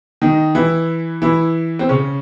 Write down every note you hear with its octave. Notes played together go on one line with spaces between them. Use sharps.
D#3 D#4
E3 E4
E3 E4
C4
C#3 C#4